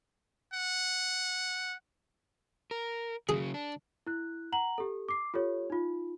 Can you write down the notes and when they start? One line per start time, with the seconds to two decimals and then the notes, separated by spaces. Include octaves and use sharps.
0.54 F#5
2.71 A#4
3.29 C#3 F#3 G#4
3.54 D4
4.07 E4 F#6
4.52 F#5 A#5 F#7
4.78 G4 A4
5.09 D6 C7
5.34 F4 G4 A4 C#5
5.70 D#4 F4